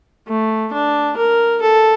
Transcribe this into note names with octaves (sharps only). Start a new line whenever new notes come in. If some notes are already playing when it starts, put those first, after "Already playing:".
A3
D4
A#4
A4